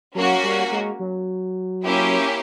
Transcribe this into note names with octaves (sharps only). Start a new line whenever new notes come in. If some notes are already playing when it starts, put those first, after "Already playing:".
F#3 A#3 C#4 F#4
G3
G#3
F#3
A#3 C#4 E4 G4